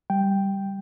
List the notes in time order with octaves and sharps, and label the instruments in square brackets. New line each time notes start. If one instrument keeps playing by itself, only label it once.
[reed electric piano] G3 G5